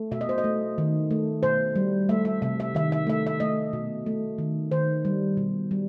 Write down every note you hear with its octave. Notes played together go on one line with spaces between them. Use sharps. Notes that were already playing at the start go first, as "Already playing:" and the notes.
Already playing: A3
B2 E5
D#5
C5
D#5
A3
D#3
A3
B2 C5
G3
A3 E5
E5
C3 E5
E5
D#3 E5
E5
A3 E5
E5
A3 D#5
B2
A3
D#3
D#3 C5
G3
B2
G3